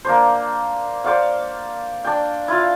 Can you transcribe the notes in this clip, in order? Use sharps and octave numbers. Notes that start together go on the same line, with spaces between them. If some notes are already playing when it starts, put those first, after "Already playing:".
A#3 D4 C5
C5 D5 F5 F#5
D4 G5
E4 F4 F5